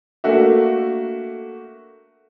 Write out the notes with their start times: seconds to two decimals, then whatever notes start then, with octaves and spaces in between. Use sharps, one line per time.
0.24 A3 A#3 D4 F#4 A4 E5